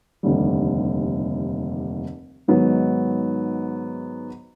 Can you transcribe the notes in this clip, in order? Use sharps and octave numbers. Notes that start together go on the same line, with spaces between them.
F1 D#2 D3 G3
G#2 D#3 F#3 B3